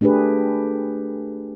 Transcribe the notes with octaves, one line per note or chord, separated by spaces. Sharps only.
A3 D4 G4 G#4 B4